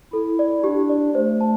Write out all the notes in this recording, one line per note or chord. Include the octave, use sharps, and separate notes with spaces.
E4 A4
D5
D4 G4
D5
A3 C5
A5